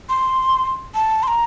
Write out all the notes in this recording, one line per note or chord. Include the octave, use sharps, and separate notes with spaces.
C6
A5
C6
A#5